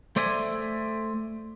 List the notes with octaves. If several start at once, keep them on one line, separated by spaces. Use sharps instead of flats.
A3 C5 D5 E5 G#5